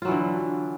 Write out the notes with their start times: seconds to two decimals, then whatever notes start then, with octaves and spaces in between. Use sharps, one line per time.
0.02 F4
0.05 F#3
0.08 E3
0.11 D3